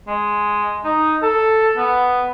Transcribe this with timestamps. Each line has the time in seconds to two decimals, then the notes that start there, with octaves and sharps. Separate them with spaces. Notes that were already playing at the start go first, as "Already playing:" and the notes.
0.08 G#3
0.84 D#4
1.22 A4
1.77 B3